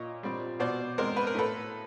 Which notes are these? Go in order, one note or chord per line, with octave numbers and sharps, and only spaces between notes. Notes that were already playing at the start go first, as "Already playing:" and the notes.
Already playing: A#2 C#5 D#5
G3 C4
B2 C5 D5
G#3 C4 A#4 C5
B4
A#4
A2 A4 B4